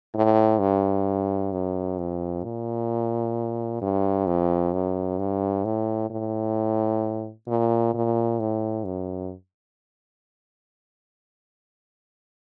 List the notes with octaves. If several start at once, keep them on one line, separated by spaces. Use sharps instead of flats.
A2
G2
F#2
F2
A#2
G2
F2
F#2
G2
A2
A2
A#2
A#2
A2
F#2